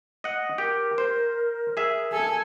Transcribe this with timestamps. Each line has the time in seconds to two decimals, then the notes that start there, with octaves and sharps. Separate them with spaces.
0.24 D#5 F#5
0.58 G4 A#4
0.98 C5
1.77 G#4 E5
2.12 A4 G#5